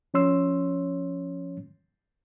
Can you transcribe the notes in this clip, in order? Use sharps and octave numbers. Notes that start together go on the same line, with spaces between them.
F3 C#4 C#5 C6 E6